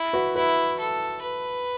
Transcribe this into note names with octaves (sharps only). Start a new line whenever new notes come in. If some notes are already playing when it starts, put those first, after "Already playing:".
Already playing: E4
F#4 B4
E4 F#4 B4
A4
B4